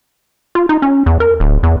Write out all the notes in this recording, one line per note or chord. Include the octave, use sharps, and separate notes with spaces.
F4
D#4
C#4
E2
A#4
D1
E2